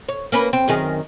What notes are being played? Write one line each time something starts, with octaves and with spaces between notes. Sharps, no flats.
C#5
A#3 C#4 B4
C4
F#2 D#3 G#4